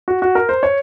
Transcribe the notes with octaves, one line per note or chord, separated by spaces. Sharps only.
F#4
F#4
A#4
C5
C#5